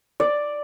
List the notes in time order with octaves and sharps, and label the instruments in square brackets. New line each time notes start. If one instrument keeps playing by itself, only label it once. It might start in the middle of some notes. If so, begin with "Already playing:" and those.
[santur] D5